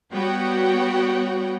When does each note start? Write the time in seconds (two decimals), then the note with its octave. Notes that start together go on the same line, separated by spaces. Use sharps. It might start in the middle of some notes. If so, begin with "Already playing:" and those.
0.14 G3 B3 F#4 C#5 F#5 G5